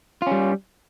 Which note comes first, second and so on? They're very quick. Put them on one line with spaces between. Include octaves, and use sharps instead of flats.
F4 C#4 G3